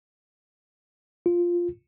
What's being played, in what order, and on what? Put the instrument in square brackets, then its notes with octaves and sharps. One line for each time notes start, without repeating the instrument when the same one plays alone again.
[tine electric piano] F4